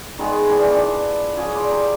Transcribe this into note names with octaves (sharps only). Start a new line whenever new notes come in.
D#3 G#3 B3 F4
D#3 E3 B3 D4
D4 F4
F3 G#4 C#5
E4 D5 C6
G3 A#5 B5